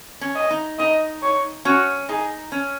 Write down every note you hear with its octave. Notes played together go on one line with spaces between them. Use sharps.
C#4
D#5
D#4
D#4 D#5
C#5
C#4 F#4
D#4 G#4
C#4